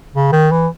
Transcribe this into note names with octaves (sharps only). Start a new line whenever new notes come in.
C#3
D#3
E3